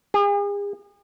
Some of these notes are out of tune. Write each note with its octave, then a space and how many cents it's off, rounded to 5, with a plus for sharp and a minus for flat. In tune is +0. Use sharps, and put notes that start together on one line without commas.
G#4 -40